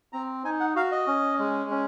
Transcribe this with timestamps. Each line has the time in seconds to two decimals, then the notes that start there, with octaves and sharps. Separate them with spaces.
0.13 C4 A#5
0.44 D#4 G#5
0.60 F#5
0.75 F#4 F5
0.92 D#5
1.07 C#4
1.39 G#3
1.70 C#4